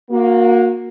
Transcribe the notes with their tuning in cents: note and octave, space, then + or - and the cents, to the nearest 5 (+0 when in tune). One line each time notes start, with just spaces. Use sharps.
A#3 +0 F#4 -30